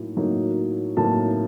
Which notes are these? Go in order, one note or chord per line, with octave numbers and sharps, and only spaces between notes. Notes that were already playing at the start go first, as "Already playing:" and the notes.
Already playing: A2 F#3 A#3 D#4
A2 F#3 A#3 D#4
A2 F#3 A#3 D#4 A5